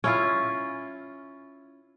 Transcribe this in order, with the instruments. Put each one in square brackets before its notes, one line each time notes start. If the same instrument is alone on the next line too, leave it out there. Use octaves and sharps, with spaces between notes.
[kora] C#4 E4 F4